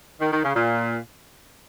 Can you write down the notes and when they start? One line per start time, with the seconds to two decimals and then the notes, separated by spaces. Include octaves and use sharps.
0.20 D#3
0.32 D#3
0.44 C#3
0.56 A#2